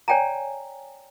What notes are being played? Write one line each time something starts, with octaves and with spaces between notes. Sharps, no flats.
C#5 D5 G5 G#5 A#5